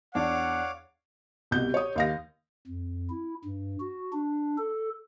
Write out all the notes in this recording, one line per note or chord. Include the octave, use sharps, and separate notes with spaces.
E2 D4 C#5 F5 F#5 D6
C2 B2 G6
C#5 D#6
D#2 F5 A#6
F2
E4
G2
F#4
D4
A4